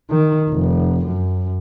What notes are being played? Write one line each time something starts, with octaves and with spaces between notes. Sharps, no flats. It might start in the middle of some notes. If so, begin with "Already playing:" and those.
D#3
F1
F#2